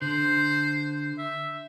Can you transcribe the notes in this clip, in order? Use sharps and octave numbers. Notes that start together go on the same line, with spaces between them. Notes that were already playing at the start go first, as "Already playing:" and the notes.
D3 C5
E5